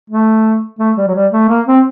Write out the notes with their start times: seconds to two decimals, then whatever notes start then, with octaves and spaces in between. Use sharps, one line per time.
0.10 A3
0.79 A3
0.97 G3
1.07 F#3
1.15 G3
1.33 A3
1.49 A#3
1.67 C4